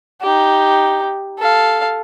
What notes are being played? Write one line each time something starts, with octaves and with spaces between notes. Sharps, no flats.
D#4 G4
A4 F5